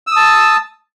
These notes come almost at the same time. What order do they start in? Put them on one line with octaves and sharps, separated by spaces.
E6 D#6 A5